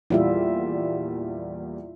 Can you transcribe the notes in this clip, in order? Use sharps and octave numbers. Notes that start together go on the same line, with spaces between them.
E2 A#2 G3 E4 F4 E5